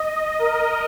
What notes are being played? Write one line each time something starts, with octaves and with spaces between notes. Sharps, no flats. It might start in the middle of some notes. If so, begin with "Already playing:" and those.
Already playing: D#5
D#5
A#4